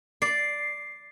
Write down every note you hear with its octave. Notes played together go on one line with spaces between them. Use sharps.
D5 C7